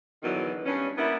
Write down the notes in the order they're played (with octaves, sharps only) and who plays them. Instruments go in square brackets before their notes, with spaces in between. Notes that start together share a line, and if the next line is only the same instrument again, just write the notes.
[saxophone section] E2 B2 D3 D#3 F#3
G2 C#4
G3 A#3 B3 E4